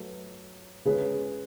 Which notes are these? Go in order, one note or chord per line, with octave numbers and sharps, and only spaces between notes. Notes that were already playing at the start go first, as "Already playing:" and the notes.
Already playing: F#3 A3 B4
C#3 G#3 C#4 G#4 B4